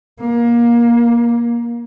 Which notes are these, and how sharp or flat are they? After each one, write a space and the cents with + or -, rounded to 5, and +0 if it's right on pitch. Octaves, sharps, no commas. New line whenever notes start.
A#3 +20